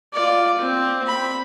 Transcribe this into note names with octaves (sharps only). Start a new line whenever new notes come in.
F4 D5
C4
B5